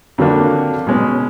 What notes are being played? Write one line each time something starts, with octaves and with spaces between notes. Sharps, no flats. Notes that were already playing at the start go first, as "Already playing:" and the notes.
F2 D3 F#3 A#3 D4
B2 G#3 C#4